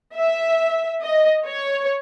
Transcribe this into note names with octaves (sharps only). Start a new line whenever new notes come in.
E5
D#5
C#5